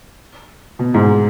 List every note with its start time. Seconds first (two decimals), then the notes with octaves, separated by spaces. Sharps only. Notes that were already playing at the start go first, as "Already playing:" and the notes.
0.79 B2
0.94 G#2